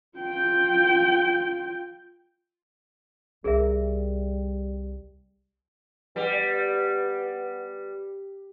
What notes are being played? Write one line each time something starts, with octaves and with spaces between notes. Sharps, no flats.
F4 G5
C2 G3 G#4 A#4 E5
G3 B3